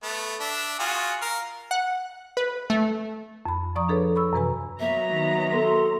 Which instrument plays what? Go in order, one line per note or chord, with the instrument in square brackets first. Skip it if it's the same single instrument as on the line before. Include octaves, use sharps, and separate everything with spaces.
[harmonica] A3 B3
D4 E5
F4 F#4 G#4
A#4 F5
[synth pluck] F#5
B4
A3
[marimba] F2 B5
F3 D5 A#5 C#6 D#6
D4 G#4 A4 B4 C#5
B5 C#6 E6
F#2 C3 E3 B4 G#5 A#5
[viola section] F#3 B3 A#5 [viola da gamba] A#3 [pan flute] E5
[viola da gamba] D#3
[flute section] F#4 A4 C6